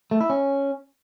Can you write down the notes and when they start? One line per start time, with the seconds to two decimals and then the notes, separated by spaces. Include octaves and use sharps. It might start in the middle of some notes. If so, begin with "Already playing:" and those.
0.11 A3
0.21 E4
0.30 C#4